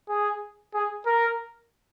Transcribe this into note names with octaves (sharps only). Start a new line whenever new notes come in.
G#4
G#4
A#4